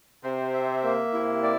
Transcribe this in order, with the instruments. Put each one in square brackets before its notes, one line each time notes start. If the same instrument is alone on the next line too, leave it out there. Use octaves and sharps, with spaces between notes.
[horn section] C3 [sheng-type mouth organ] C5
[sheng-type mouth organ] E5
A#3
[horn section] C3 [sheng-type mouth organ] E4
[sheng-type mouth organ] D5